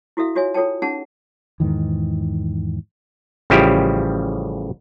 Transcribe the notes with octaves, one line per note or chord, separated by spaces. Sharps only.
E4 F#4 A4 E5 F5
F4 F#4 C#5 E5 G#5
F4 A4 C#5 G5 A5
C#4 D#4 G#4 F#5 A5
E2 G#2 D#3 E3
A1 C#3 F3 G3 E4 G4